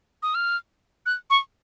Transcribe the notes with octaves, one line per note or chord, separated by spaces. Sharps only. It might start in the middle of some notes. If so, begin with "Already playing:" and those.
D#6
F6
F#6
C#6